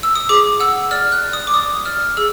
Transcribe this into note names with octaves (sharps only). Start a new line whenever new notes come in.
E6
D#6
G#4 D6
F#5 E6
D5 F6
F#6
D5
D#6
D6
D5 D#6
D5 F6
G#4 E6